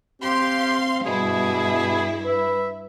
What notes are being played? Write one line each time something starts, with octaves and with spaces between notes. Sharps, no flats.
C4 G4 F5 C6
G2 B2 E4 G#4
B4 E5